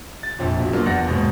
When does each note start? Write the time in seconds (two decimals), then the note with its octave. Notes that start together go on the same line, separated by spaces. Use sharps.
0.23 A6
0.39 A#1 F2 A#2
0.60 E1
0.72 F3 F#3 A#3 D4 F4
0.86 E2 F#5 A#6
1.06 D#2 G#2 B2